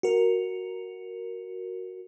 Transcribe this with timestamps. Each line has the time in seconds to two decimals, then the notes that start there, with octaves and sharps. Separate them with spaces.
0.03 F#4 A#4